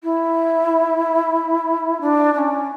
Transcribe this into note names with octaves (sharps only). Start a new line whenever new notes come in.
E4
D4
D4
C#4